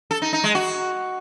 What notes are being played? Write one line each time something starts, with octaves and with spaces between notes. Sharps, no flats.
A4
D#4
D#4
G#3
F#4